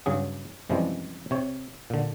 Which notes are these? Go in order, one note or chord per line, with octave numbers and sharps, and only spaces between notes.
G2 C#3 F#3 G#4
F#2 C3 E3 F3 G3 G#3
C3 C#5
A#2 D3